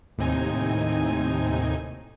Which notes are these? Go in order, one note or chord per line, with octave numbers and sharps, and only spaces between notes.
D#2 A2 C3 C4 D#4 G#5